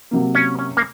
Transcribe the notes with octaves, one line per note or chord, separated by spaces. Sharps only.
C3 F#3 A#3
C#4
C#4
A#3